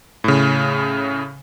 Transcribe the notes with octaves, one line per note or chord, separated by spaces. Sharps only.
A2 C#3